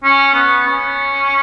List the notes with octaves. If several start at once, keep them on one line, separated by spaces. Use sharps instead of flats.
C#4
B3
C#4